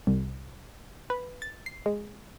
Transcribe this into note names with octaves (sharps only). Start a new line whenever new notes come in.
C2
B4
A6
C7
G#3